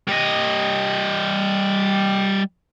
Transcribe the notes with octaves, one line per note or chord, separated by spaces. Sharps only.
G3 D#5